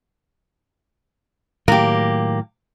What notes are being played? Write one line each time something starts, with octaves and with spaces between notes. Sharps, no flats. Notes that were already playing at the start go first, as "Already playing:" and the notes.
A2 D#3 F#3 A#3 G4